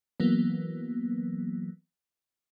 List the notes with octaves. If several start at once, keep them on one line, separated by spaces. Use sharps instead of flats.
E3 F#3 A#3 B3